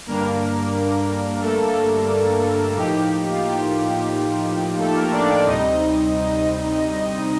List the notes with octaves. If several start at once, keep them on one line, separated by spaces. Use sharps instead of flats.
G2 D3 G3 A#3 D4 A#4
A3 A4
A2 F3 A#3 D#4 G4
F4
G4
A3 A4
A#3 A#4
D4 D5
D4 D5
D2 C3 G3 C4 D#4 D#5